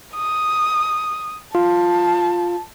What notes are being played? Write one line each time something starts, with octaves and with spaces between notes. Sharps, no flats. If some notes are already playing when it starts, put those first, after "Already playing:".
D#6
F4 A5